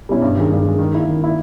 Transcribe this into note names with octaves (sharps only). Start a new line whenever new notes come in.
B2 G3 C#4 E4
G2
D#3 G#3
G2
D#3 G#3
D#3
A#3 E4
D#3
A#3 E4